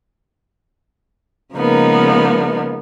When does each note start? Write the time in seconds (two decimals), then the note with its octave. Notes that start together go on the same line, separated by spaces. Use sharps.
1.54 C#3 F3 G#3 A#3 B3 D#4